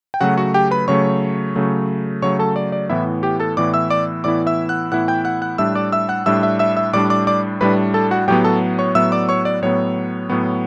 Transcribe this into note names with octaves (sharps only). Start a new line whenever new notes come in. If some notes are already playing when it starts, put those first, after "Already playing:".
G5
C#3 F#3 A3 F#4 F#5
F#4 F#5
G4 G5
B4 B5
C#3 F#3 A3 C#5 C#6
C#3 F#3 A3
C#3 F#3 A3 C#5 C#6
A4 A5
D5
D5
A2 E3 B3 E4 E5
G4 G5
A4 A5
A2 E3 B3 E4 D5 D6
E5 E6
D5 D6
A2 E3 B3 E4 D5 D6
E5 E6
F#5 F#6
A2 E3 B3 E4 F#5 F#6
G5 G6
F#5 F#6
F#5 F#6
A2 G3 D4 E5 E6
D5 D6
E5 E6
F#5 F#6
A2 G3 D4 E5 E6
E5 E6
E5 E6
E5 E6
A2 G3 D4 D5 D6
D5 D6
D5 D6
A2 G3 D4 B4 B5
A4 A5
F#4 F#5
A2 F#3 B3 G4 G5
A4 A5
C#5 C#6
A2 F#3 B3 E5 E6
D5 D6
C#5 C#6
D5
A2 F#3 B3 C#5
A2 F#3 B3